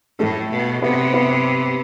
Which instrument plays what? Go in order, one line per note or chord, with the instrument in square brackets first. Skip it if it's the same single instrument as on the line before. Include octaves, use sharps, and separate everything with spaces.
[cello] A2 [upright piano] A3 A4
[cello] B2
[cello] C3 [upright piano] B3 B4
[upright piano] B3 B4